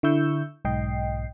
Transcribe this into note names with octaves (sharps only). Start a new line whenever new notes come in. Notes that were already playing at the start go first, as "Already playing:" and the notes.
D3 E4 C#6 E6 G6
B1 G#2 D#5 G5 C7